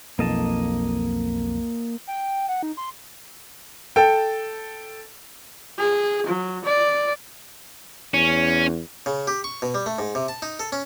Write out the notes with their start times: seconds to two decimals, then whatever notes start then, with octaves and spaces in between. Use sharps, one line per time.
0.19 B1 F2 A#3 D#5 A5
2.07 G5
2.49 F#5
2.63 D#4
2.77 C6
3.96 A4 G5
5.79 G#4
6.26 F#3
6.64 D5
8.14 E2 C#4
9.06 C#3
9.27 G4
9.44 C#6
9.62 B2
9.74 G3
9.86 A3
9.99 G#2
10.15 C3
10.28 A5
10.42 D#4
10.60 A4
10.72 C#4